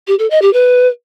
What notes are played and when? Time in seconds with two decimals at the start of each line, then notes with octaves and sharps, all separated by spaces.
0.07 G4
0.19 A4
0.30 D#5
0.42 G4
0.53 B4